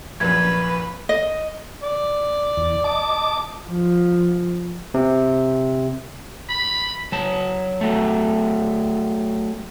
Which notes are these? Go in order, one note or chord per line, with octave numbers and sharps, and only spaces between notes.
A#1 F#2 B4 G#6
D#5
D5
E2
D#5 A5 D6
F3
C3
B5
F#3 A5
F#3 A3